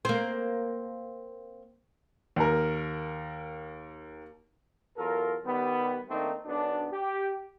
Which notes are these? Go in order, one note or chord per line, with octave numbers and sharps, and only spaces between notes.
A#3 C4
D#2 A#4
E2 F#3 F4 A4 A#4
D#3 G3 B3
D#3 A3 A#3 C4 D4 D#4
B1 F#2 B3 D4
G4